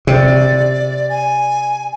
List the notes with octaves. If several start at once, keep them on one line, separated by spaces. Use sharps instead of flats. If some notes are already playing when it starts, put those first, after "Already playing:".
C3 D5
G#5